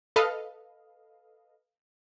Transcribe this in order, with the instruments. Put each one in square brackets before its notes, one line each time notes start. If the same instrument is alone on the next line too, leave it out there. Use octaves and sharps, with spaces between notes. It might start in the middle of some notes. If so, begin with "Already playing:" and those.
[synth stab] A4 B4 D#5 F5